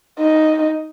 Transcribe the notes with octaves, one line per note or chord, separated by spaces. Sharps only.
D#4